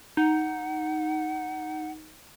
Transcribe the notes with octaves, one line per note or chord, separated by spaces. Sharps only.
D#4 F#5